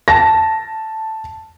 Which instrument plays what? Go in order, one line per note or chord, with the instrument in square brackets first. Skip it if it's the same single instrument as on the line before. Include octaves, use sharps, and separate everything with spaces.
[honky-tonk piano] A5 A#6